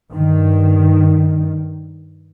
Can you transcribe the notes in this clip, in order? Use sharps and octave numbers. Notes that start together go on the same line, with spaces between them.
G2 D#3